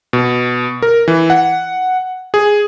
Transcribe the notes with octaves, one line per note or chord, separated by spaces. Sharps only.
B2
A#4
E3
F#5
G#4